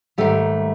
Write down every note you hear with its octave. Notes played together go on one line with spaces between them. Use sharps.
G#2 D#3 G3 A3